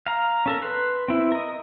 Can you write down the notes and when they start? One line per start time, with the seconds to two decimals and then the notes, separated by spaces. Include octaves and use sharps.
0.07 F5 A#5
0.46 C#4 A4 A#4
0.62 B4 C6
1.08 C4 E4
1.32 A#4 D#5